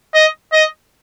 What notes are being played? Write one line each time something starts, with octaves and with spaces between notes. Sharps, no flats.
D#5
D#5